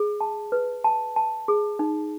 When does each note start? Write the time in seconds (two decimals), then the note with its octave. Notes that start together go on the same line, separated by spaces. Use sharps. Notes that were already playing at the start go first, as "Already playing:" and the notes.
Already playing: G#4
0.21 A5
0.52 B4
0.84 A5
1.16 A5
1.48 G#4
1.79 D#4